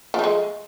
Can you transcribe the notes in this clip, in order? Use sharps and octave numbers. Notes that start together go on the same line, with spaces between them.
F3 G#3 A3